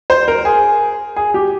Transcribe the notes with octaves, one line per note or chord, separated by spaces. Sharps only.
C5
A#4
G#4
G#4
G4